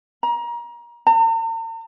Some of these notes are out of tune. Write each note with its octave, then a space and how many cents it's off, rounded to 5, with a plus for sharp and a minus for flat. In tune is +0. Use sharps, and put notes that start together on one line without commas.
A#5 +30
A#5 -45